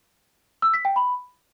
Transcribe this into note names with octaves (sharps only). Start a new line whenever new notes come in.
E6
B6
G5
B5